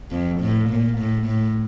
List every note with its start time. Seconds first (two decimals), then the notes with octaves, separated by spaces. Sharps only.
0.11 F2
0.41 A2
0.69 A#2
0.97 A2
1.27 A2